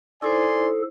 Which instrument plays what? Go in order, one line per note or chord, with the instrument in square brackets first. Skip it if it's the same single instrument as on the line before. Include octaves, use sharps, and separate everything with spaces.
[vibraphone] D#4 E4 C5 [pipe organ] A4 [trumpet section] D5 G#5 C6